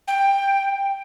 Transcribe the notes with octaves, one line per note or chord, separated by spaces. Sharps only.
G5